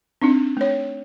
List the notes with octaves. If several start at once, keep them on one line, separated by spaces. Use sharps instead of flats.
C4 D4 D#4
A3 C#5